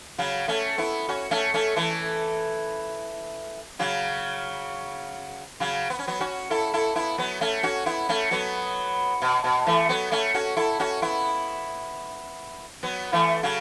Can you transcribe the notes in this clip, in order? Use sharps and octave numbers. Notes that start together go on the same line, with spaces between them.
C#3 F#3
A3 C#4
B3 E4
C#4 F#4
A3 C#4
A3 C#4
E3 A3
C#3 F#3
C#3 F#3
B3
C#4
F#3 B3
C#4 F#4
E4 A4
E4 A4
B3 E4
F#3 B3
A3 C#4
C#4 F#4
B3 E4
A3 C#4
F#3 B3
B2
B2
E3 A3
F#3 B3
A3 C#4
C#4 F#4
E4 A4
C#4 F#4
B3 E4
F#3 B3
E3 A3
C#3 F#3